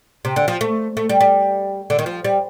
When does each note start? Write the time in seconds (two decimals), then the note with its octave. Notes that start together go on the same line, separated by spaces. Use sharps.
0.25 C3
0.36 D3
0.48 F3
0.61 A3
0.97 A3
1.09 G3
1.21 G3
1.90 D3
1.99 D#3
2.06 F3
2.25 G3